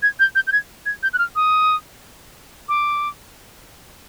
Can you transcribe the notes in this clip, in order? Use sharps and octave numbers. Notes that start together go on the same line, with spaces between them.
G#6
G6
G6
G6
G#6
G#6
G6
F#6
F6
D#6
D6